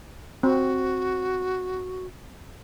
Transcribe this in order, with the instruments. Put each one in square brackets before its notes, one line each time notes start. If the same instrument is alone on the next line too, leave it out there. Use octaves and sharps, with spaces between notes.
[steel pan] C4 [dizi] F#4